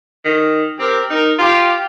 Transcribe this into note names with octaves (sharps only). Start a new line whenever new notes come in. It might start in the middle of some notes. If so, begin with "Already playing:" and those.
D#3
C4 G4 A#4
D#4 A#4
F4 G4